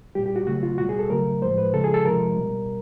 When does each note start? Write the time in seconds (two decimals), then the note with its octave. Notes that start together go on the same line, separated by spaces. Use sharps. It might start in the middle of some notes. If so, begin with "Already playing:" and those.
0.15 A#2 G3 G4
0.26 G4
0.36 F#4
0.47 C#3 F#3 A3 F#4
0.63 F4
0.78 B2 G3 F#4
0.89 G#4
0.99 A4
1.10 C#3 F#3 A3 A#4
1.42 A2 F3 G#3 C5
1.58 B4
1.73 C#3 F3 G#3 A4
1.84 G#4
1.94 A4
2.05 C3 F3 G#3 A#4
2.37 B2 G3